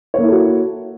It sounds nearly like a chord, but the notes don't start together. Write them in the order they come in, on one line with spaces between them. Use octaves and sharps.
C#5 A#3 E4 A4 F#4